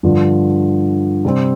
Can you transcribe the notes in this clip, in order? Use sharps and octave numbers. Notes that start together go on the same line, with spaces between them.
G2 D3 F3
C3 G3 C4